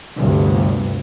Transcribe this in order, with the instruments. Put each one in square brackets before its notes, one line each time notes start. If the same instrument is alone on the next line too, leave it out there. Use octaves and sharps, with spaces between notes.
[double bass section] G1 D2 G2 C3